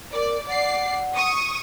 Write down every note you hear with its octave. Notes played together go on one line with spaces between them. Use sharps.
A#4 D5
D5 F#5 C7
C#6 D#6